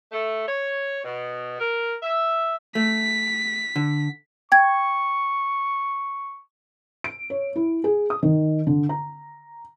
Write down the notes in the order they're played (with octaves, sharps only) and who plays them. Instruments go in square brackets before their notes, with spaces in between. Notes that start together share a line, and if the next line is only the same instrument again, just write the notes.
[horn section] A3
C#5
B2
A#4
E5
[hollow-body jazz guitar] A3 [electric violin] B6
[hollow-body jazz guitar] D3
[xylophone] G5 G#6 [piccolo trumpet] C#6
[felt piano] D7
C#5
E4
G#4
D#6
D#3
D3
A#5